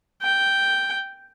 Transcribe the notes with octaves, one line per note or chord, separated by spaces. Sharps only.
G5